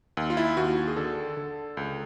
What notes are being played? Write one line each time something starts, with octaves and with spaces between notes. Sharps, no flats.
D#2
F4
E4
D#2 F#4
G#4
D3 A4
D3
C#2